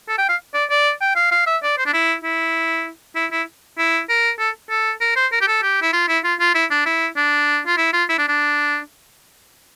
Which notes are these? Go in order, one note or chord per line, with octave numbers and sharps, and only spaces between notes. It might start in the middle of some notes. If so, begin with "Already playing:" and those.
A4
G5
F5
D5
D5
G5
F5
F5
E5
D5
C5
D4
E4
E4
E4
E4
E4
A#4
A4
A4
A#4
C5
A#4
G4
A4
G4
E4
F4
E4
F4
F4
E4
D4
E4
D4
F4
E4
F4
E4
D4
D4